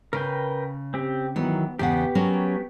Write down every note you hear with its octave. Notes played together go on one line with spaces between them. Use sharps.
C#3 A#4 B4 G5
C4 G4
D#3 E3 F#3 B3
E2 C#3 B3 G4 F#5
F#3 C#4 A#4